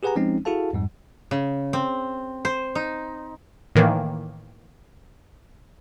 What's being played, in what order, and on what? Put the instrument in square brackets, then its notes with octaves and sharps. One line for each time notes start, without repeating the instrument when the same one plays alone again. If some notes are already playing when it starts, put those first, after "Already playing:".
[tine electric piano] G4 G#4 B4 F#5 G#5 A#5
F3 G#3 C4 C#4 D#4
E4 F#4 G#4 A4 F5 A5
F2 G#2 G3
[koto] C#3
C4
C5
D#4
[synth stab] A2 D#3 E3 A#3